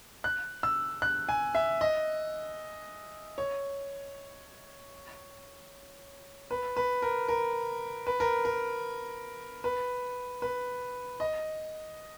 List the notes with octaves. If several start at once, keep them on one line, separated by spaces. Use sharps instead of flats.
F#6
E6
F#6
G#5
E5
D#5
C#5
B4
B4
A#4
A#4
B4
A#4
A#4
B4
B4
D#5